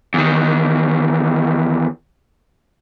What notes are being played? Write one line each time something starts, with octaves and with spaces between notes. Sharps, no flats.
E2 D#3